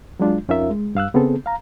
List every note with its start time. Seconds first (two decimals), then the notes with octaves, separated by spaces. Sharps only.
0.20 F#3 G#3 D4 F4
0.49 F2 C#4 D#4 F4 A#4 E5
0.70 G#3
0.95 G2 F5 E6 F#6
1.14 C#3 B3 C4 G#4 A4
1.46 F5 A#5